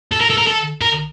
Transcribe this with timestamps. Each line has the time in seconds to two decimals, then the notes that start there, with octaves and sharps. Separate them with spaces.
0.12 A4
0.21 A#4
0.30 A4
0.38 A#4
0.47 A4
0.82 A#4